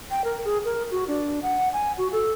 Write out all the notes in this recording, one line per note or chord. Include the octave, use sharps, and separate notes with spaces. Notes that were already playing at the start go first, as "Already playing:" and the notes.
G5
A#4
G#4
A#4
F#4
D4
F#5
G#5
F#4
A4